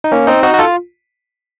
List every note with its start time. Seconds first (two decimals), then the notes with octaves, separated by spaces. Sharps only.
0.04 D#4
0.12 A#3 C#4
0.27 C4 D#4
0.43 D#4 F#4
0.54 F#4
0.59 F4 A4